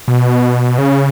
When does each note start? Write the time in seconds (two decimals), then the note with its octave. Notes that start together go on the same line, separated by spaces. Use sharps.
0.08 B2
0.78 C#3